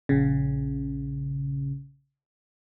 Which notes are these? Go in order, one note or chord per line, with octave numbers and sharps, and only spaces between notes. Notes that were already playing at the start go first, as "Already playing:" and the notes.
A#1 C#3